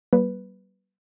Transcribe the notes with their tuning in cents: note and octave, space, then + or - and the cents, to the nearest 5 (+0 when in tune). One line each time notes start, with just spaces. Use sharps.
G3 -45 A#3 +30 B4 +0